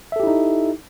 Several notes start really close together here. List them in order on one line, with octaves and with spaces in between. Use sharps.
E5 A4 G4 E4 D#4